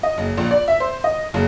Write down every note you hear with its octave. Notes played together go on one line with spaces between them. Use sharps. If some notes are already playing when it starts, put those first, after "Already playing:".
D#5
F#1
A#1
D5
E5
C5
D#5
F#1